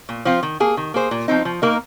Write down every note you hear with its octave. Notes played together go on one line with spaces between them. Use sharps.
A#2
F3 C4 F4
D#3
A#3 G#4
D#3
A#3 G#4 C5
A#2
F3 C4 D#4
F3
A#3 D#4 A#4